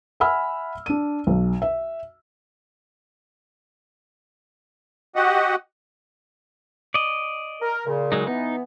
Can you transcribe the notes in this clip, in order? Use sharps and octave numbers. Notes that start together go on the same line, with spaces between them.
E5 F#5 G#5 B5 E6 F6
D4 D#7
B1
E5
F#4 G4 D#5 F#5
D5 D#5
A#4
A#2 C#3
F#3 G#3 D#4
E3 B3 D#4